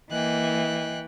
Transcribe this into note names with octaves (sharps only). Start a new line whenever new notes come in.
E3 A#3 D#5 G5 G#5 F#6